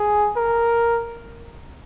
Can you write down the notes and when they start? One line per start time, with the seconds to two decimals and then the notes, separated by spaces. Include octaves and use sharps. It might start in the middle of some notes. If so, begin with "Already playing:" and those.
Already playing: G#4
0.37 A#4